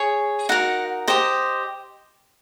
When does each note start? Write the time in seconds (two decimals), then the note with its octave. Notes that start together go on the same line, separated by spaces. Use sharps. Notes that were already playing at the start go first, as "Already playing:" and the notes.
Already playing: G#4 C#5
0.49 D#4 F#4 A#4 F#5
1.08 G4 C5 D#5